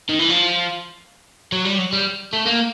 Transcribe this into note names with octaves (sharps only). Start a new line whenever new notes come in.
D#3
E3
F3
F#3
G3
F#3
G3
A3
A#3